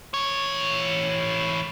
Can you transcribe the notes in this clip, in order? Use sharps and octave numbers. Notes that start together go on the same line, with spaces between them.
E3 C#5